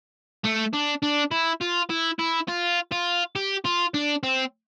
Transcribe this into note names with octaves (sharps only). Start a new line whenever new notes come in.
A3
D4
D4
E4
F4
E4
E4
F4
F4
G4
F4
D4
C4